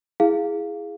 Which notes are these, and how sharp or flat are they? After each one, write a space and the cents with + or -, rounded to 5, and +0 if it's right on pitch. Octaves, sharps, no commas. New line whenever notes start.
E4 +0 G#4 +0 F5 +0